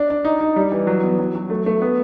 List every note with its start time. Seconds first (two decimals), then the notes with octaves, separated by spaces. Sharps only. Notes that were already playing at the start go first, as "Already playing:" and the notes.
Already playing: D4
0.10 D4
0.25 D#4
0.41 D#4
0.56 G3
0.72 E3
0.87 F#3
1.03 B3
1.19 F#3
1.35 F#3
1.50 A3
1.66 A3
1.82 B3